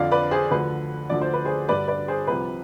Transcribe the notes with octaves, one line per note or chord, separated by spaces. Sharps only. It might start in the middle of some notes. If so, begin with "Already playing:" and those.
Already playing: F2 D3 F3 D5 F5
B4 D5
G#4 C5
D2 D3 F3 B4
D2 D3 F3 D5
C5
B4
G#4 C5
G2 D3 G3 B4 D5
B4 D5
G#4 C5
C2 C3 F3 B4